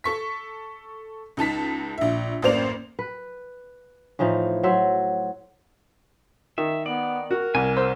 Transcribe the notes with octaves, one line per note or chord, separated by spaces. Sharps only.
A4 C#6 B6
C#2 D#4 A5 B6
A#1 E5
A1 F#2 A#3 C5 D5 F7
B4
A2 E3 F3 D#4
F#3 C5 E5
D#3 E5
B3 D5
F#4 A#4
C2 G#5
C5 E6